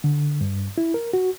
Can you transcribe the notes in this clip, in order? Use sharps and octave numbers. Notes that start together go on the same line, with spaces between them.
D3
G2
E4
A#4
F#4